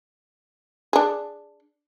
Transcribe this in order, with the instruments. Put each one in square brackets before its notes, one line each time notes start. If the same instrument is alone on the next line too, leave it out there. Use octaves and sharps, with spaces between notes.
[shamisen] D4 G#4